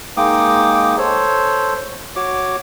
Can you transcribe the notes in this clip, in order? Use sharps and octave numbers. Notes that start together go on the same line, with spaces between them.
G#3 A#3 D#4 G5 D6 D#6
A4 C5 C#5
F#4 C#5 D6